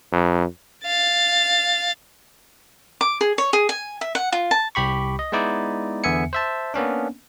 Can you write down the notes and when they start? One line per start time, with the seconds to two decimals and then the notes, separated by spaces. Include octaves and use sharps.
0.13 F2
0.84 F5 A6
3.01 D6
3.21 G#4
3.38 C#5
3.53 G#4
3.69 G#5
4.01 E5
4.15 F#5
4.32 F4
4.51 A5
4.75 C2 G4 B5 C#6
5.19 D#5
5.32 G#3 B3 D#4 E4 D5
6.04 E2 D3 B3 E5 G#5 C#7
6.33 C5 E5 A5
6.74 A#3 B3 C#4 D4